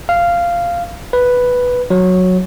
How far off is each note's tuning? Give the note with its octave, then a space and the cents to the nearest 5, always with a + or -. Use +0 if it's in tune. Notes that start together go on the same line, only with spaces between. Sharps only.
F5 -10
B4 +0
F#3 -10